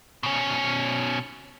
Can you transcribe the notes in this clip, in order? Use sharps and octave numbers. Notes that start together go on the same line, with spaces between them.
B2 C#4